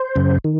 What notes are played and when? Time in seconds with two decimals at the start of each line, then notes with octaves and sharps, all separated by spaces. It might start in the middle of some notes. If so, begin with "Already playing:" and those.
Already playing: C5
0.15 F#2 C#3
0.44 D#3